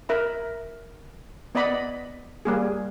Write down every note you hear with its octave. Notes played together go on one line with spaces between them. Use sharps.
A#4 E5 B5
B3 D5 D#5 F#5 B5
G3 A#3 G#4